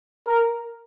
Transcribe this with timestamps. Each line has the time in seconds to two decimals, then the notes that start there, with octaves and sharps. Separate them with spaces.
0.27 A#4